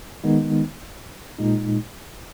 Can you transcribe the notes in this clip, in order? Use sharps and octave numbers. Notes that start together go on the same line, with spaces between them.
D#3 G#3 B3 D#4
A#2 G#3 D#4